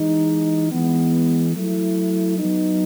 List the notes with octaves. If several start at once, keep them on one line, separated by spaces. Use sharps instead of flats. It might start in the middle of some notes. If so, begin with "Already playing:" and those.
Already playing: E3 G#3 D#4
E3 G#3 B3
F#3 A3 E4
F#3 B3 D#4